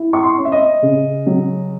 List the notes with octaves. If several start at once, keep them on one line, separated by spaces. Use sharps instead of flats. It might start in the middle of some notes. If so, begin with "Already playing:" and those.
Already playing: E4
C#6
C6
C#4
E5
D#5
C#3
F#3